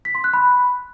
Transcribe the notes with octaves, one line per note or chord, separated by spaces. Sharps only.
B6
C6
F#6
B5